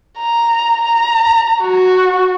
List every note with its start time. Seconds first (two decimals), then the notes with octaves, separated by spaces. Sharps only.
0.19 A#5
0.83 A#5
1.61 F#4